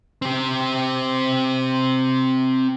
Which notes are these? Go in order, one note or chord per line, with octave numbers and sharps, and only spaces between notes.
C4 G4